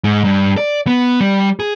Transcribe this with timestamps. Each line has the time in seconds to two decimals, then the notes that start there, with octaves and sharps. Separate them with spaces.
0.04 G#2
0.24 G2
0.58 D5
0.87 B3
1.21 G3
1.60 G#4